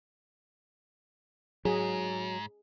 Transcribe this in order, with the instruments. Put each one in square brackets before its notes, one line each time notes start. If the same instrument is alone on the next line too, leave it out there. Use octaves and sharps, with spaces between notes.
[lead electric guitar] G#2 [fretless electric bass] F#3 [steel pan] G#4